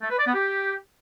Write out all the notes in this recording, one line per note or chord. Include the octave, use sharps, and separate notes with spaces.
A3
B4
D5
B3
G4